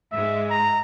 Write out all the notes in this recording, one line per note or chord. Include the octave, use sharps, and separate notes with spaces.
G#2 G#3 E5
A#5